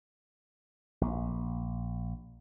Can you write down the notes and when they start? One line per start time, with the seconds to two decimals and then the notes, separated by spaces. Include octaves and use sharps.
1.01 A#1